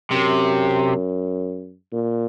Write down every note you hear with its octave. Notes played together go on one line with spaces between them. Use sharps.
F#2 C3
A#2